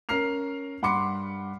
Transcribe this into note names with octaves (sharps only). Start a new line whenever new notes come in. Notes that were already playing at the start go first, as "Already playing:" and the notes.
C#4 A#4 A#5 F6 C7 F7
G2 F#5 B5 C6 D6 C#7